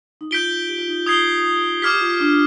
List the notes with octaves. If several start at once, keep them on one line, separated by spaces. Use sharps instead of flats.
D#4
F4 G6 B6 D7 G7
G4
F4
D#4
F4
D#6 G#6 C7 G7
G4 D6 F6 G#6 B6
G4
F4
D4